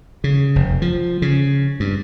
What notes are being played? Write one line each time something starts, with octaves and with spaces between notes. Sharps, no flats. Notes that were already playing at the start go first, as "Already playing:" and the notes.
C#3
F1
F3
C#3
G2